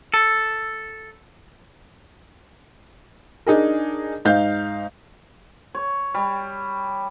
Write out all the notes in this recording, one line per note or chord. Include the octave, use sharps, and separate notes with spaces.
A4
D4 D#4 G#4 A#4
G#2 D#4 F5 G6
C#5
G3